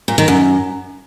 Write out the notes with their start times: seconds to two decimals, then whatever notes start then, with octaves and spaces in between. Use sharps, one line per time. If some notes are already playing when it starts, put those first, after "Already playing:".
0.08 A#2
0.18 D#3
0.28 F#2